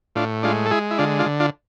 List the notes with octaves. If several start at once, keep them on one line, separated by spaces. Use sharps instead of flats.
A2 D4 F4
G#3 D4 F4
A4
G#3 E4 G#4
E4
D3 D4 F4
D4 F4
D3
D4 F4